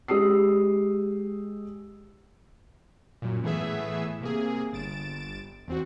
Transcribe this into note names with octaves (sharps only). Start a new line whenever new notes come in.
G#3 G4 D#6 E6 C7
F#2 A#2
A2 E3 A3 B3 G#4 E5
C3 A#3 G#4
G1 A6 D7 E7
E2 C4 F#4